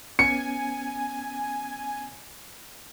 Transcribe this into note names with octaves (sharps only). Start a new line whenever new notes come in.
B3 C#4 G#5 C#7